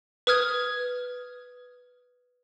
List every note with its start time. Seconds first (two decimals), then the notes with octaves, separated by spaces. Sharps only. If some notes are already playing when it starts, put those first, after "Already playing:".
0.27 B4 D#6 F6 G#6